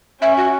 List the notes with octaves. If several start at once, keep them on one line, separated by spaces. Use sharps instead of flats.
C#4 E5
F#4